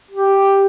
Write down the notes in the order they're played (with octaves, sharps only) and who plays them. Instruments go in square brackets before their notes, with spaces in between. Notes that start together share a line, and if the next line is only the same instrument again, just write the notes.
[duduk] G4